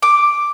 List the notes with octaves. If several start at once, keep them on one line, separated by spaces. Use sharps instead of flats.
D6